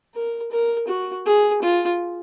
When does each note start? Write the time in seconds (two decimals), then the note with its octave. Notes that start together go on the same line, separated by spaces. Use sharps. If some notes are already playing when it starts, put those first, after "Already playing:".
0.15 A#4
0.51 A#4
0.88 F#4
1.26 G#4
1.62 F4